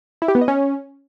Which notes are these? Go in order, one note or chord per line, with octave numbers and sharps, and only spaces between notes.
E4
G4
B3
D#5
C#4